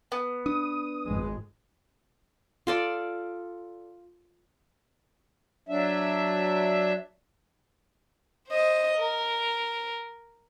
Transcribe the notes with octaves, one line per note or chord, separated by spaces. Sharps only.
B3
D4 D#6
G#1 F2 G#3
F4 A4 D5
F#3 D4 E5
C5 D#5
A#4